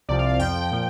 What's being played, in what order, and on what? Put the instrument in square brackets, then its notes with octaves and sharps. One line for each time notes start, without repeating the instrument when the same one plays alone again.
[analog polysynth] C2 C3 F3 D5
F5
F5
F2 F3 G5
A#2 F3